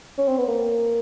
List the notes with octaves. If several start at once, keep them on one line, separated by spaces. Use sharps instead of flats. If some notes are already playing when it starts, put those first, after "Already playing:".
C#4
C4
B3
A#3